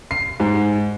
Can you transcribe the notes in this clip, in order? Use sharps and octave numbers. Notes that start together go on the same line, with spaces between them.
C7
G#2